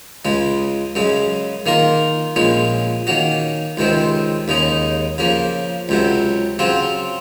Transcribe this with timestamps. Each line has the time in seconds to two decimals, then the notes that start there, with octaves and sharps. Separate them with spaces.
0.25 C#2 C#3 G#3
0.95 F#2 C#3 G#3
1.66 D#3 A#3 F4 A#4
2.36 A#1 A#2 G#3 C#4
3.07 D#3 A#3 C#4 F#4
3.77 C#2 C3 D#3 G#3 C4
4.48 D#2 C#3 G#3 D#4
5.18 C#3 F3 A#3
5.89 C#2 C3 F#3
6.59 C#3 F#3 C4 F4